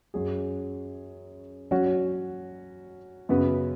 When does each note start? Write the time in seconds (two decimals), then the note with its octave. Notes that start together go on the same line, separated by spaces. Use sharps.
0.14 F#2 F#3 C#4 G#4
1.71 F#3 C#4 F#4 C#5
3.29 F#2 C#3 B3 F#4 B4